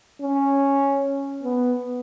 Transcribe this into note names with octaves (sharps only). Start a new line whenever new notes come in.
C#4
B3